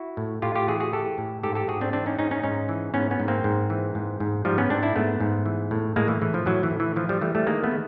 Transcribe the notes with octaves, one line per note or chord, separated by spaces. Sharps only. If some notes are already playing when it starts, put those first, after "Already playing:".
Already playing: E4 F#4
A2
A2 F4 G4
F4 G4
E3 F#4 G#4
F#4 G#4
E3 G4 A4
A2
G#2 G4 A4
G4 A4
G#2 F#4 G#4
C4 D4
E3 C4 D4
C#4 D#4
G#2 C#4 D#4
C#4 D#4
G#2 C#4 D#4
E3
G#2 B3 C#4
B3 C#4
G#2
A#3 C4
G#2
E3
G#2
G#2
G#2 F3 G3
B3 C#4
G#2 C4 D4
D4 E4
G#2 A3 B3
G#2
E3
A2
A2 G#3 A#3
E3
A2 E3
F3
A2 E3 F#3
E3
A2
E3
E3 F3
F3 G3
E3 G3 A3
G3 A3
D#3 G#3 A#3
A3 B3
D#3